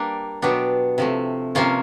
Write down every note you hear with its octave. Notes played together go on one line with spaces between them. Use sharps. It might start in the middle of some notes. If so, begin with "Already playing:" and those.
Already playing: G3 A#3 D4
B2 F#3 B3 D4 G4
C3 F3 A3
C3 F3 A#3 C#4 F4